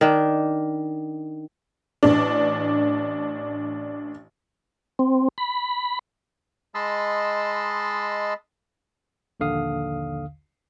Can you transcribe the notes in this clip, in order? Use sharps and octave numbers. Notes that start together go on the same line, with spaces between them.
D#3 D4
A1 D4
C4
B5
G#3 D#5 A5 B5 C6 E6
A#1 D#2 D3 F5 D#6